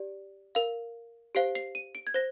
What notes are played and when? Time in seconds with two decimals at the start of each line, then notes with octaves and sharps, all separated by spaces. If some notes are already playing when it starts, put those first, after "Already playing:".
Already playing: G4 D5
0.55 A#4 F5
1.35 G4 C5 F5 C7
1.55 C7
1.75 D#7
1.95 D7
2.07 G#6
2.14 C5 A#6